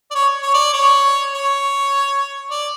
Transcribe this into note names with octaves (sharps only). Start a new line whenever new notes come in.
D5
C#5
C#5
D5
C#5
C#5
D5